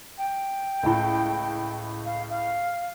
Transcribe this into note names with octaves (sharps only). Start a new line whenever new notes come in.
G5
C#2 A2
F5
F5